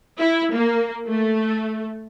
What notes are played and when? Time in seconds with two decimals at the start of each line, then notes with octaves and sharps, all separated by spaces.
0.19 E4
0.53 A#3
1.07 A3